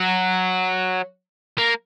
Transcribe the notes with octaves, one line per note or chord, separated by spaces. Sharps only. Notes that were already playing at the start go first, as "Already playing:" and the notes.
Already playing: F#3
A#3